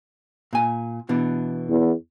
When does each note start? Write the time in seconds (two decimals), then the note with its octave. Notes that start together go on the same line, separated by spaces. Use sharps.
0.53 A#2 G#5
1.09 B2 E3 D4
1.69 E2